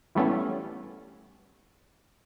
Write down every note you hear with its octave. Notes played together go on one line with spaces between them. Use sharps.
E3 G3 A3 B3 C#4